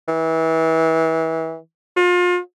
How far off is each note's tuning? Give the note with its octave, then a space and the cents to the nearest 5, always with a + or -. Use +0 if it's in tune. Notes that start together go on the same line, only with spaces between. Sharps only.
E3 -30
F4 +35